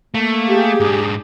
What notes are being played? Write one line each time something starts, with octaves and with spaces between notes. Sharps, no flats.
A3 A#3
G4 G#4
G#2 D4